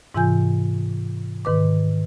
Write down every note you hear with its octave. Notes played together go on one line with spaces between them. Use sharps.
G#2 C3 E3 F4 G#5 G6
G#2 D#3 B4 D6